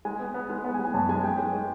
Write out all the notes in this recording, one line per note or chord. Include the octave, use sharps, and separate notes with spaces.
G#3 G#5
B3
B3
G#3
B3
G#5
G#3
G#5
F#2 A5
G#3 G#5
G#3 G5
G#3
G#3